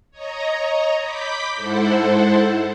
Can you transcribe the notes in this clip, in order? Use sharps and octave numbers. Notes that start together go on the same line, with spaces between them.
C#5 D#5 A#5
B5 D6 G6 B6
G#2 E4 A4 C5 F#5